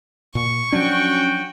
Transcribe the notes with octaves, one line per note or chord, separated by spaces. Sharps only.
A#2 C#6
F3 F#3 C#4 D4 F#4 G5